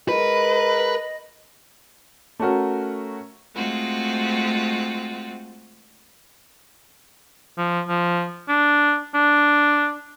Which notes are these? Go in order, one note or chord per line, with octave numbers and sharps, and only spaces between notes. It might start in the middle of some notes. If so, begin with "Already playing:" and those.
G#3 A#4 B4 D#5
A3 C#4 F#4 A#4
G#3 A3 C4 F4 F#4
F3
F3
D4
D4